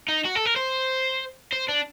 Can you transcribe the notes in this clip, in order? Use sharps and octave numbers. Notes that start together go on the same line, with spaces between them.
D#4
F#4
A4
A#4
C5
C5
D4